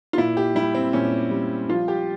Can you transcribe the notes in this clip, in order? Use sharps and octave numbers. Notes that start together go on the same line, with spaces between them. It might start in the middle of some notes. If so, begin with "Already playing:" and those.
F4
A#2 E4
G4
G3 E4
C4
A#2 C#4
G3
F3 F4
G4